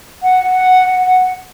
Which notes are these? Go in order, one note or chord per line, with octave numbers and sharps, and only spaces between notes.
F#5